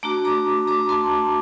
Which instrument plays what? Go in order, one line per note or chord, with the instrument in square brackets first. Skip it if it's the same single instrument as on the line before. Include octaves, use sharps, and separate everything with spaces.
[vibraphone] A3 D4 F#4 A#5 D6
A#5 D6
A#5 D6
A5 C6